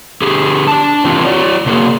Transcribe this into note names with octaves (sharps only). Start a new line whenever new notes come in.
D3 G4 G#4
D4 A5
C3 E3 C4 D4 F4 G4
F#4 C#5 D5
C3 A#3 F#4 G#4